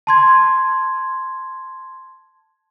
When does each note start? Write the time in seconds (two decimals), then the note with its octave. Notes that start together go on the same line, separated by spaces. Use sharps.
0.07 A5 C6 G#6